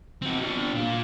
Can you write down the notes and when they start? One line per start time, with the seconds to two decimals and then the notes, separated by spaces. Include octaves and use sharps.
0.22 C4 F#4
0.41 D3 G3
0.73 A#2